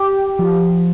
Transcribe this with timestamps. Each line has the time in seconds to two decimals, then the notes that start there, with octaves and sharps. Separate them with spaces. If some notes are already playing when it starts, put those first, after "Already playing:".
Already playing: G4
0.39 F3